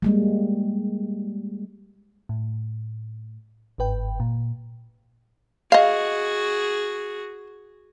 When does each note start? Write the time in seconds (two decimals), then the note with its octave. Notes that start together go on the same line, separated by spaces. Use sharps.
0.02 G3 G#3 A#3
2.29 A2
3.78 G1 G#2 B4 G5
4.20 A#2
5.72 F#4 G#4 D#5 F5